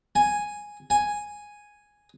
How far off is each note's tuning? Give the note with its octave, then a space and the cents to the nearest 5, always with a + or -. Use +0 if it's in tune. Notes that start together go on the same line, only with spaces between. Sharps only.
G#5 +0
G#5 +0